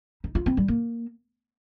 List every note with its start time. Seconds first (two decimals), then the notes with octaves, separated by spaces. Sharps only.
0.24 D#4
0.35 F4
0.46 C4
0.57 G3
0.68 A#3